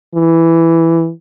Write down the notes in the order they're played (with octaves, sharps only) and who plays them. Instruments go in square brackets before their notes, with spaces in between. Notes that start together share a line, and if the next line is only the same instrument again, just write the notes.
[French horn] E3